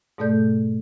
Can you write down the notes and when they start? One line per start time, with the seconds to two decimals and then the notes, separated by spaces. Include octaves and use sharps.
0.18 G#2 B2 A3 A4 D5 G6